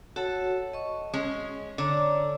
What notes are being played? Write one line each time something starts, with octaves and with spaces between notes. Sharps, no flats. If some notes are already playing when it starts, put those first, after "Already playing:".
F#4 A4 C#5 F#5
D#5 C#6
G#3 C#4
D3 C#5 D5 A#5